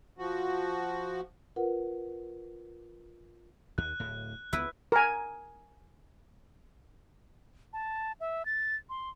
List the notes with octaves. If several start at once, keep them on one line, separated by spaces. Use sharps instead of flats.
F3 F#4
F4 A#4 B4 F#5
D#2 F#6
D1 A2
C#2 B3 E4 B4
A#4 G#5
A5
E5
A6
C6